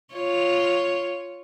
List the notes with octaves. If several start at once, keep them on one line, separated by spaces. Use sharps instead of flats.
F4 C#5